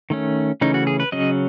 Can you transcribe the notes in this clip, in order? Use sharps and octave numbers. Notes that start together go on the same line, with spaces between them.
D#3 A3 C#4
C#3 E3 A3 C#4 D#4
F#4
G#4
B4
C#3 F#3 C#4 D#5